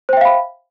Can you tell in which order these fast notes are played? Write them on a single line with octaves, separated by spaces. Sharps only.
C5 G5 E5 F5 B5